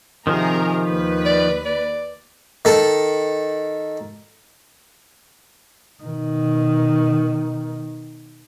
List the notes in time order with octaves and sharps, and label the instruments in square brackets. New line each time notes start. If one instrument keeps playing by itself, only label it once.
[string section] C3 G#4 A#4 [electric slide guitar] D#3 F3
[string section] D#2 B4
[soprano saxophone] D5
D5
[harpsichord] D#3 A4
[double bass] B2 D#3